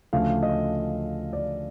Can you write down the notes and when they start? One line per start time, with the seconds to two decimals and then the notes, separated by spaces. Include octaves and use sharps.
0.13 D2 C#3 F3 A3 D4 F5
0.43 D#5
1.33 D5